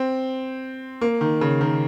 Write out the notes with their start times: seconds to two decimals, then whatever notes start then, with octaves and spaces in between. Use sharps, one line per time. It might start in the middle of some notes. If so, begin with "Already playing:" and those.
Already playing: C4
1.01 A#3
1.21 D#3
1.41 C#3
1.61 D#3